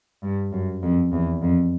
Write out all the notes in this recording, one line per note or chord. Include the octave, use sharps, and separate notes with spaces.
G2
F#2
F2
E2
F2